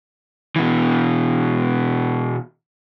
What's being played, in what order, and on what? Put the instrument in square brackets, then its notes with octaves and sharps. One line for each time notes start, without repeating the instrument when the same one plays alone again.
[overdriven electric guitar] B2 E3